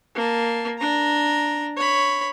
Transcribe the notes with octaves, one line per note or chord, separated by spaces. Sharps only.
A#3 A5
D4 A#5
C#5 B5